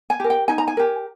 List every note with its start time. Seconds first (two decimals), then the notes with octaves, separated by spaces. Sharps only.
0.10 G#5
0.20 G4 A#4
0.30 G5
0.48 D#4 G#5
0.58 A#5
0.67 G#5
0.77 G4 A#4